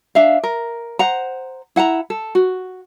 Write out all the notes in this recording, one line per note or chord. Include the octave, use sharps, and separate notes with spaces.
D4 E5 F5
A#4
C5 F#5 A#5
E4 F#5 A5 A#5
A4
F#4